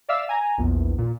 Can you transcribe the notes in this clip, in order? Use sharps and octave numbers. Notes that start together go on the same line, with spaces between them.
D5 E5 F5 D6 E6
G#5 A#5
A#1 E2
A#2